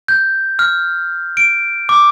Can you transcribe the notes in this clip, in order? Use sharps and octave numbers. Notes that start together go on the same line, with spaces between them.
G6
F6
D7
D6